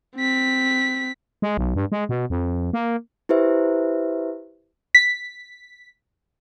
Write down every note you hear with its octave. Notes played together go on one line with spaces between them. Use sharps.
C4 B6
G#3
B1
G2
G#3
B2
F2
A#3
E4 G4 B4 C5 E5
B6